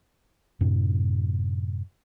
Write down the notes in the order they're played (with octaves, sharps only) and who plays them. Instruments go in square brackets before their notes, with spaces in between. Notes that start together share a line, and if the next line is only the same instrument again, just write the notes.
[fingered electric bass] F#2 A2 C3